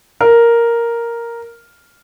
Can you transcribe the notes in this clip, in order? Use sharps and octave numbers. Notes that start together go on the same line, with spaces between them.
A#4